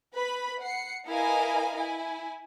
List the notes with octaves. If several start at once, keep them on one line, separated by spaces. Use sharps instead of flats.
B4 B5
F#5 C7 C#7
E4 A#4 B4 D#5 F5 G#5
E4 G#5